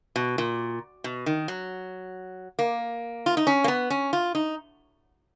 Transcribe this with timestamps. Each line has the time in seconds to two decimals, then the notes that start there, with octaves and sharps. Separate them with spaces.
0.16 B2
0.38 A#2
1.04 B2
1.26 D#3
1.48 F#3
2.59 A#3
3.26 F4
3.37 D#4
3.47 C#4
3.64 A#3
3.68 B3
3.90 C#4
4.13 F4
4.35 D#4